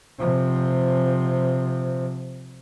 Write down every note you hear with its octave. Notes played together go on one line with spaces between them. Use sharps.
C3 F3